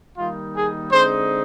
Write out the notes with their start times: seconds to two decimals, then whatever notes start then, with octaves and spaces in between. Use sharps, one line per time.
0.17 D#3 G3 A#3 D#4 F4
0.55 G#4
0.92 D3 G#3 C4 D#4 C5